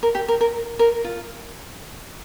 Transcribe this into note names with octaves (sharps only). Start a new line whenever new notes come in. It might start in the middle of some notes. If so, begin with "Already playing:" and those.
A#4
G4
A#4
A#4
A#4
F4